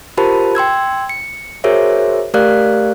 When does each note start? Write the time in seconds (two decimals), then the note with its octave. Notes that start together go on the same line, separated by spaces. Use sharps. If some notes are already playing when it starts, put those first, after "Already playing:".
0.17 F4 G4 A#4 C5 A5 B5
0.55 G5 C6 E6 G#6
1.09 C#7
1.64 F#4 G#4 A#4 C5 C#5 E5
2.34 A3 G4 A#4 D5 F5 F#6